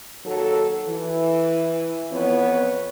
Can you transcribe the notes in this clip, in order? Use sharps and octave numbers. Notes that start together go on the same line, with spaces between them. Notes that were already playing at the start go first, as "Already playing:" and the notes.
D#2 F#3 A4
E3
F2 B3 B4 C#5